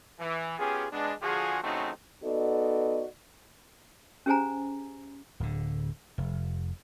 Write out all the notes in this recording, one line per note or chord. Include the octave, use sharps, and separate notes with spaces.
E3
B3 C#4 F4 G4 G#4
G#3 B3 D4
D3 F3 F4 F#4 G#4
A1 C#3 A3 C4 D#4 F#4
B3 D#4 F#4 A4 D5 D#5
C#4 G4 G#4 C5 G#5 A#5
D1 D3
F1